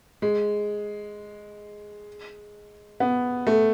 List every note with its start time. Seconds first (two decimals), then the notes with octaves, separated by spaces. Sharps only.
0.22 G#3
3.00 B3
3.47 A3